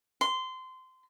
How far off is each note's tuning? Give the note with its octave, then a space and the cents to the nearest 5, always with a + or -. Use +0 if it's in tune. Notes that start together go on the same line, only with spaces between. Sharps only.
C6 -20